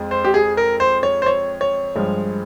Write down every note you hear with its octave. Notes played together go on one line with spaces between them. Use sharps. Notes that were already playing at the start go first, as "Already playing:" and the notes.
Already playing: F2 G#3
C5
G4
G#4
A#4
C5
C#5
C5
C#5
C#5
G2 F3 G#3